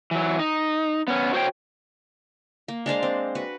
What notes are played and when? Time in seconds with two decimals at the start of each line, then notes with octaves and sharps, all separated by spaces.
0.11 E3 F#3
0.39 D#4
1.08 B3 C#4
1.34 F#4 C5 C#5 G5
2.68 A#3
2.86 G#3 D4 C5 F5
3.03 C4
3.35 F#4 B4